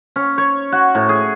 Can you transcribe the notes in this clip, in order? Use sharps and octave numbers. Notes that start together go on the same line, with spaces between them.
C#4
C#5
F#4
A2
G#4